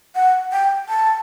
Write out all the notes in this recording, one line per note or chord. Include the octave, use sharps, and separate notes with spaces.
F#5
G5
A5